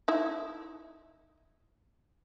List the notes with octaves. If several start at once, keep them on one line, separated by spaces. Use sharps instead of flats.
D#4 E4